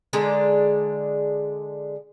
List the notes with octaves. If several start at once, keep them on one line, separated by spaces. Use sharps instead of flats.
D3 G#3 D4 A#5